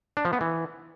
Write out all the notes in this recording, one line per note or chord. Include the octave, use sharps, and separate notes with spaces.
D4
F3
B3
E3